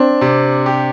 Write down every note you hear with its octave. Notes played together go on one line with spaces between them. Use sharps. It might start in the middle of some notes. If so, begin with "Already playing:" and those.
Already playing: C4 D4
C3
G4